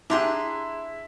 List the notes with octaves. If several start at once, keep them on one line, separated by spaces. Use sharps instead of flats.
D4 E4 G4 G#4 A#5 C6 F#6